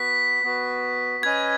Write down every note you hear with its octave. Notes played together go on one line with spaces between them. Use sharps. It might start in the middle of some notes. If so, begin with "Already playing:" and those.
Already playing: B3 F#4 B4 B6
B3 F#4 B4
C#4 B4 D#5 G#5 G#6